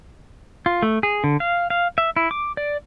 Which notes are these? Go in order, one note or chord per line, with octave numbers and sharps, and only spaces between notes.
F4
A3
G#4
D3
F5
F5
E5
E4
D6
D5